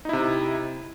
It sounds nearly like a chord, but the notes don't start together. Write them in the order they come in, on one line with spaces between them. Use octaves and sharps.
D#4 E4 C3